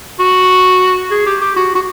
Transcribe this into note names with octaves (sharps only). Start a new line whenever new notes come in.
F#4
G#4
G4
G4
F#4
F#4